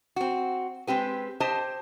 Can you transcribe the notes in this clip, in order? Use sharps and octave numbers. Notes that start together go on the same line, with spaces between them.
C4 F#4
G#3 C4 G4 B4
G4 C5 D#5 A5